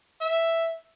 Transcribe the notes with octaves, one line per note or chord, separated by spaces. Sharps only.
E5